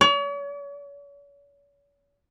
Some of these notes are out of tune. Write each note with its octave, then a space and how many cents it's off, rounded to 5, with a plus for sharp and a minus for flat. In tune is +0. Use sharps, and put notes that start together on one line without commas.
C#5 +40